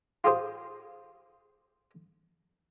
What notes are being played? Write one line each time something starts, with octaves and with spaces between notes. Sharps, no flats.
F4 G4 G#4 C5